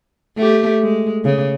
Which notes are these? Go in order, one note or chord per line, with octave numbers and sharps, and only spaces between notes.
A3 G4
G#3
C#3